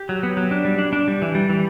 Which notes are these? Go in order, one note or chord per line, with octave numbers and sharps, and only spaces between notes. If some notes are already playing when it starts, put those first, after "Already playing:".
Already playing: G4
F#3
B3
F#3
D4
G3
D4
D4
G3
E3
G3
E3